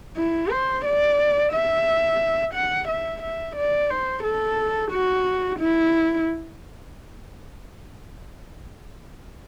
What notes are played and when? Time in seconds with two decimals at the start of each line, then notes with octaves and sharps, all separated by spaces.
0.17 E4
0.51 C5
0.85 D5
1.53 E5
2.54 F#5
2.88 E5
3.22 E5
3.56 D5
3.90 C5
4.24 A4
4.91 F#4
5.59 E4